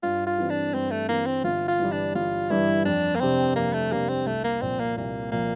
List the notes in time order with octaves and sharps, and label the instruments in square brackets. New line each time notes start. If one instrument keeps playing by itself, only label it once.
[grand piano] G2 [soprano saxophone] F4
[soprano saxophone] F4
[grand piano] E3 G3 C4
[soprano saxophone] D4
[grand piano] G2 [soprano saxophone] C4
[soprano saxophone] A3
[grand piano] E3 G3 C4 [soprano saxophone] A#3
[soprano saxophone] C4
[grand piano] G1 [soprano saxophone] F4
[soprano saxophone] F4
[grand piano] G2 E3 G3
[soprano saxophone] D4
[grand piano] G1 [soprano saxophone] F4
[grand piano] G2 E3 G3 [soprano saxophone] E4
[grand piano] F2 [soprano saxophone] D4
[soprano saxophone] A#3
[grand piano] C3 G3 D4 G4 [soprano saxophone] C4
[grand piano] F2 [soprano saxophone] A#3
[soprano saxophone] A3
[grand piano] C3 G3 D4 G4 [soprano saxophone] A#3
[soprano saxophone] C4
[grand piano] C2 [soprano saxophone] A3
[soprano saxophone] A#3
[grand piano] A#2 F3 [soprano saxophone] C4
[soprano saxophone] A#3
[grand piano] C2 [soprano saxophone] A#3
[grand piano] A#2 F3 [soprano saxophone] A#3